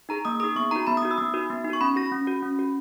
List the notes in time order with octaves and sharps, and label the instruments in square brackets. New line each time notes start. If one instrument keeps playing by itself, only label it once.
[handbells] D#4 G#4 A#5
A#3 D#6
D#4 G#4 D#6
B3 C#6
D#4 F#4 A#5
B3 B5
D#6
D#4 F#4
E6
B3 D#6
D#4 F#4
B3
D#4
F#4 C#6
C#4 B5
F#4 A#6
C#4
F#4
C#4
F#4